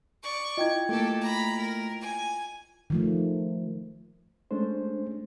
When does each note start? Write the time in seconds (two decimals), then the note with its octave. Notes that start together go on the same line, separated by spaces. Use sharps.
0.23 D5 C#6
0.57 E4 F4 D#5 G5 G#6
0.89 A3 A#3 G4 A4
1.21 A#5 B5
1.58 A#4
2.01 G#5
2.90 D#3 F3 A3
4.51 G#3 A3 C#4 D4 C5